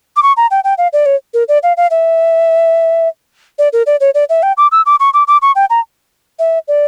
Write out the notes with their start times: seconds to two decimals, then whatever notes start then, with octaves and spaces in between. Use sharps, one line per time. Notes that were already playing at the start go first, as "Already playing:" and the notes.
0.16 D6
0.23 C#6
0.37 A#5
0.51 G5
0.64 G5
0.78 F5
0.93 D5
1.06 C#5
1.34 A#4
1.48 D5
1.63 F5
1.77 F5
1.90 E5
3.59 D5
3.73 A#4
3.86 D5
4.00 C#5
4.14 D5
4.29 E5
4.43 G5
4.57 D6
4.72 E6
4.86 D6
5.00 C#6
5.14 D6
5.27 D6
5.42 C#6
5.55 G5
5.70 A#5
6.39 E5
6.68 D5